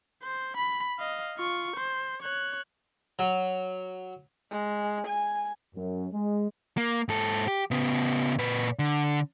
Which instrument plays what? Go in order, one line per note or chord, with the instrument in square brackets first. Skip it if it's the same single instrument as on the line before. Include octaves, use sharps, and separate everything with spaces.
[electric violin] C5
B5
D#5 F5
F4 C#6
C5
C#5 F#6
[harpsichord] F#3
[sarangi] G#3
G#5
[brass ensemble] F#2
G#3
[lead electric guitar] A#3
G#2 A4
G4
C#3 B3
A#2 B4
D3